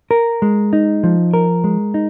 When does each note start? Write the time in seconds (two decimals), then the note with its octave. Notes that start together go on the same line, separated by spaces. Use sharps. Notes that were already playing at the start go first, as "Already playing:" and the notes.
0.11 A#4
0.42 G#3
0.73 D#4
1.03 F3
1.34 A#4
1.64 G#3
1.94 D#4